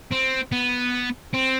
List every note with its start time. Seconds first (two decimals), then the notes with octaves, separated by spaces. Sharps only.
0.12 C4
0.52 B3
1.33 C4